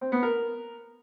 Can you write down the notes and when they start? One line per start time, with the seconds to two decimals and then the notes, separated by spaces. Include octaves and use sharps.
0.01 C4
0.12 B3
0.23 A#4